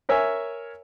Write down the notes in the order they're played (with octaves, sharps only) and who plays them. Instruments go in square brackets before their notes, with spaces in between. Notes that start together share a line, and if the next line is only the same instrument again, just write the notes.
[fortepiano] A#4 C#5 E5 G#5